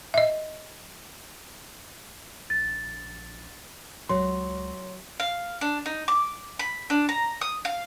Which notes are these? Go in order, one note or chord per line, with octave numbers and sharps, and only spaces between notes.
D#5 E5
A#1 A6
C#2 F#3 C#5 C6
F5
D4
D#4
D6
B5
D4
A#5
D#6
F5